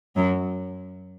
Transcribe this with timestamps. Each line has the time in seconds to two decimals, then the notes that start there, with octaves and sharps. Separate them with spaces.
0.16 F#2 F#3